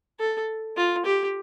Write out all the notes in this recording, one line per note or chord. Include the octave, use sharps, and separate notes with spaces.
A4
F4
G4